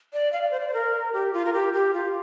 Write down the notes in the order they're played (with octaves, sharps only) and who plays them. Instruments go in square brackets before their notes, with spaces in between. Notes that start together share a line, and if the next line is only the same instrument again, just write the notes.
[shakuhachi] D5
F5
D5
C5
D5
C5
A#4
G4
F4
A#4
G4
G4
F4